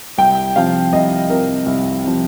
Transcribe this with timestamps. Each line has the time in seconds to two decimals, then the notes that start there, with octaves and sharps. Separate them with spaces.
0.18 C2 G5
0.56 C3 F3 F5
0.92 C2 D#5
1.29 C3 F3 A#4
1.66 C2
2.05 C3 F3